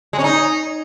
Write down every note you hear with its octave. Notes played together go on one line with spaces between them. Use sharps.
G#3
C#4
D#4